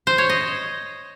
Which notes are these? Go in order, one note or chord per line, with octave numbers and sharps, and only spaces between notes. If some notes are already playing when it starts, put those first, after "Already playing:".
C5
C#5
D#5